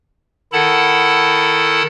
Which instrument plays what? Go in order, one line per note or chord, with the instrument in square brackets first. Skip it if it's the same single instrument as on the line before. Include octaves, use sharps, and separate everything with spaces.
[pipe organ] D#3 E4 A4 F#5 A5 B5